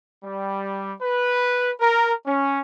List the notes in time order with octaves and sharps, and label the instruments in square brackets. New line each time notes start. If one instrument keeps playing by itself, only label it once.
[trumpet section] G3
B4
A#4
C#4